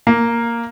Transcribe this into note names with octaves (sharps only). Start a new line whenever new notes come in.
A#3